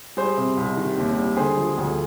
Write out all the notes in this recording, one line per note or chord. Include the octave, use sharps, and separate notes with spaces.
G3 G#4 C5
C3
C2
D#3
D#2
G3
D3 G#4 C5
F3
D2